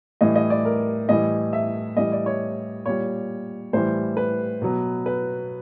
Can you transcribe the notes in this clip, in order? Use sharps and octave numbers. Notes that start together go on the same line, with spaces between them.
A2 E3 G3 D#5
D#5
D5
A#4
A2 E3 G3 D#5
E5
A2 E3 G3 D#5
D5
C#5
A#2 G3 C#5
A2 E3 G3 C5
B4
B2 F#3
B4